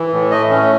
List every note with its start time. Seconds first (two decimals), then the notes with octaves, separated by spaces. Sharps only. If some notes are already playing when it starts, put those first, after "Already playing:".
Already playing: E3
0.13 A2
0.31 A3 D#5
0.50 C#4